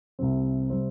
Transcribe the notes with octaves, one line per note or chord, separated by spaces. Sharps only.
C2 C3 G3 C4
C3 G3 C4